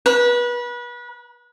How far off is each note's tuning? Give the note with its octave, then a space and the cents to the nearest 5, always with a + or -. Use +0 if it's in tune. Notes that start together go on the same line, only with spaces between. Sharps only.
B4 -30